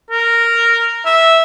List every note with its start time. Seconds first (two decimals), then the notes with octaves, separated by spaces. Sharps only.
0.11 A#4
1.05 E5